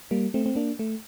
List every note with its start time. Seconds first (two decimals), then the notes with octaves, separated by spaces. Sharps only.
0.11 G3 A#3
0.34 A3 C4
0.46 C4
0.56 A#3 D4
0.79 A3